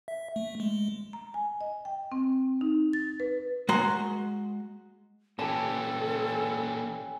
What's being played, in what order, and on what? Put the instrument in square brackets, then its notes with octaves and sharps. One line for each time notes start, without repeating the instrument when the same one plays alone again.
[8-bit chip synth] E5
A3
G#3
[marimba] A#5
G#5
D#5
G5
C4
D#4
A6
B4
[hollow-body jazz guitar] G#3 F#4 F#5 A#5 C6
[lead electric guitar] A#2 E3 [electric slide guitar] C#4 G4 [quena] A4 [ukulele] A5